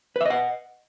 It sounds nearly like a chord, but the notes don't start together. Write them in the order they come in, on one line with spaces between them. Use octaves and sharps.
B4 E5 D#5 F#5